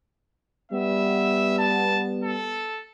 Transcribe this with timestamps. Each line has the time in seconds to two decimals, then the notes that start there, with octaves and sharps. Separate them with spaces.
0.71 G3 B3 E5
1.58 A5
2.23 A4